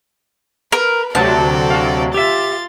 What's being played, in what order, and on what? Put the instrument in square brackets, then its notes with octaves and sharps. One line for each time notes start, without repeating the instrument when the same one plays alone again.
[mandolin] A#4 [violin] B4
[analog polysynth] D2 C3 F#3 [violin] A4 D5 [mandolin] A5
[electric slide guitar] F#4 F5
[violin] F4 A6 [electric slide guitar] G4 E5